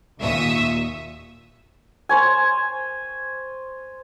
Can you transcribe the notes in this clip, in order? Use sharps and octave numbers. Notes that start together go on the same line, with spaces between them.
D#2 A#2 E5 C#6 D#6 E6
C5 C#5 G#5